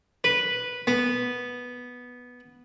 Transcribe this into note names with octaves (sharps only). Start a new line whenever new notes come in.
B4
B3